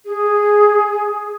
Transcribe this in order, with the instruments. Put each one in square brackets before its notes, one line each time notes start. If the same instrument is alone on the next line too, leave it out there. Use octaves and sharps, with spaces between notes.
[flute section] G#4